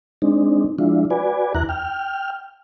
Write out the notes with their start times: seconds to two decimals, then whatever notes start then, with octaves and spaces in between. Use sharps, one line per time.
0.22 G#3 C4 D4 D#4
0.79 F3 G#3 D4 E4 F4
1.10 F#4 B4 D5 G#5
1.55 E2 E4 A#5 F#6
1.69 G5 F6